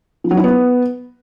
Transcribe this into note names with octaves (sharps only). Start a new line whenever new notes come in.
F3
F#3
E4
B3